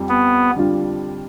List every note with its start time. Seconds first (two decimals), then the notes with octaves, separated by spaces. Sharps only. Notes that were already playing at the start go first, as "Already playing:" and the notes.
Already playing: F2 G3 F4
0.09 B3
0.56 D3 G3 D4 F4